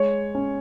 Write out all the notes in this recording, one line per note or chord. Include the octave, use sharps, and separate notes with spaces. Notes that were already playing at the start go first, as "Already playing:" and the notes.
Already playing: G#3 C#5
C#4